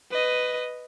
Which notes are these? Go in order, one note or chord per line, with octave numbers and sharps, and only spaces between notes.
B4 D#5